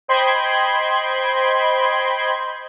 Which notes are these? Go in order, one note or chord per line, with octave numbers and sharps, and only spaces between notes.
C5 D#5 G5 B5 C6 G#6